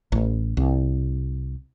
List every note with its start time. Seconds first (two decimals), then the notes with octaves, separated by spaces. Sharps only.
0.12 A1
0.57 C2